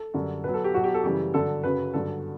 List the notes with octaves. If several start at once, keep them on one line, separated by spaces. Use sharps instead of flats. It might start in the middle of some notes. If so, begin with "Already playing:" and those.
Already playing: A4
F#2 D3 G3
B2 F#3 B4
A4
G4
B2 F#3 F#4
G4
A4
F#2 C#3 E3 G3 G4
G2 D3 F#3 A4
F#2 C#3 F#3 B4
G2 D3 F#3 A4